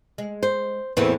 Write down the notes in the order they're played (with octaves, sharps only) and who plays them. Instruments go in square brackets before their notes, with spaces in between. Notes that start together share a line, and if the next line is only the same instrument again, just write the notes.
[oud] G#3
[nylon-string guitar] C5
[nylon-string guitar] E2 A2 E3 [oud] A#3 C4 B4